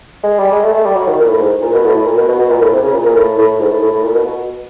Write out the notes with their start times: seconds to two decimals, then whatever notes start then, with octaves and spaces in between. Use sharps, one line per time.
0.23 G#3
0.38 G3
0.52 G#3
0.63 A3
0.74 A3
0.85 G3
0.96 F#3
1.07 D#3
1.20 A#2
1.29 A2
1.40 G#2
1.62 A#2
1.73 B2
1.84 A2
1.95 A2
2.06 A#2
2.17 B2
2.28 B2
2.39 B2
2.50 A#2
2.61 A2
2.72 C3
2.83 C#3
2.94 A#2
3.05 A#2
3.16 A2
3.38 A2
3.60 G#2
3.71 A2
3.82 A2
3.92 A2
4.04 A#2
4.14 B2
4.26 B2